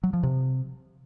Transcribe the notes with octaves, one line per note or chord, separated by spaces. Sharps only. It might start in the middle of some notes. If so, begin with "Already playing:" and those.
F#3
F3
C3